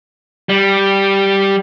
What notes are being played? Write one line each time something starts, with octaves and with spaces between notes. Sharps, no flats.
G3